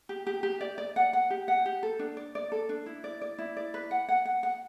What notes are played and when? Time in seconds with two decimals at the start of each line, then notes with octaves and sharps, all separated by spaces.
0.09 G4
0.27 G4
0.43 G4
0.61 D5
0.78 D5
0.96 F#5
1.13 F#5
1.30 G4
1.48 F#5
1.66 G4
1.83 A4
1.99 D4
2.17 D5
2.35 D5
2.52 A4
2.69 D4
2.86 E4
3.04 D5
3.21 D5
3.39 E4
3.57 D5
3.74 B4
3.91 F#5
4.08 F#5
4.25 F#5
4.43 F#5